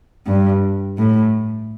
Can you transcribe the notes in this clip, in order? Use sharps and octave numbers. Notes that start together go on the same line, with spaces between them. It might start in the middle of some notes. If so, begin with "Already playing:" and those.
G2
A2